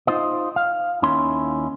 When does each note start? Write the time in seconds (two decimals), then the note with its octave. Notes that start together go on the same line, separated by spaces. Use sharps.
0.07 D#4 F4 C5 D#5
0.56 F5
1.02 D#2 D#3 C#4 E4 C6